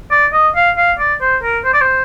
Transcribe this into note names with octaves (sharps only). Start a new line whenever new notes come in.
D5
D#5
F5
F5
D5
C5
A#4
C5
D5
C5